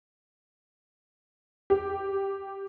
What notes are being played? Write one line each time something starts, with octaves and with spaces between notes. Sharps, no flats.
G4